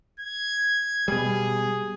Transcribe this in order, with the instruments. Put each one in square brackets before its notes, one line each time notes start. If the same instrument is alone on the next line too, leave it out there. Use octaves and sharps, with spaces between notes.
[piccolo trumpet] G#6
[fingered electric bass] B2 G3 [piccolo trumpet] G#4